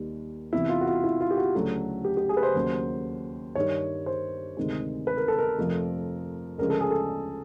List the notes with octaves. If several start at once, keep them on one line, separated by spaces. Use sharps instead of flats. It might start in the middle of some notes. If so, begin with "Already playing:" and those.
Already playing: D#2 D#3 G3
E2 C3 E3 E4
F4
F#4
F4
E4
F4
G4
F#4
D2 C#3 F#3 A3
G4
G4
G#4
B4
C5
D#2 C#3 F#3
G2 D#3 G3 C#5
C5
D2 C3 D#3 G#3
B4
A#4
A4
A#4
F2 C3 F3 A3
D2 C#3 F3 G#3 A#4
A4
G#4
A4